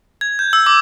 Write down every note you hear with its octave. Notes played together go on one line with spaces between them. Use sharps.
G#6
G6
E6
D6